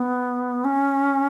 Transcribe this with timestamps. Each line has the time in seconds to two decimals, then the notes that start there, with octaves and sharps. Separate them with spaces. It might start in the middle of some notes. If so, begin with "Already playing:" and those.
Already playing: B3
0.65 C#4